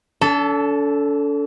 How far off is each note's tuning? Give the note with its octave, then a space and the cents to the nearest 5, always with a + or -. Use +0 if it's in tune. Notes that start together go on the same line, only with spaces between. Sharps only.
D4 -45 A4 +0